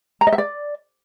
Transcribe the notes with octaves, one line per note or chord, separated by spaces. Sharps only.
A#5
D#5
E5
D5